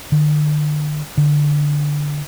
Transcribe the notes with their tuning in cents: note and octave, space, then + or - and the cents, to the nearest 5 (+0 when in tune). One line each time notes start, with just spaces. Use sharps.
D3 +40
D3 +0